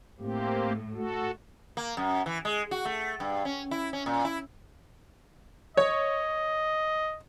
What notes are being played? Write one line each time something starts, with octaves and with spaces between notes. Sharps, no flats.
A2 A#3 C4 G4
F#4 A4
A#3
F#2
E3
G#3
F#4
A3
G2
C#4
E4
C#4
A#2
E4
C#5 D#5